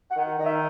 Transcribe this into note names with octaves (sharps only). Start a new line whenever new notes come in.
F#5
D#3
F#5
D#3 D#5
E5